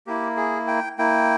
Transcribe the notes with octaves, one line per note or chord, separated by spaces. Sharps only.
A#3 E4 G4
G#4
G5
A#3 E4 G5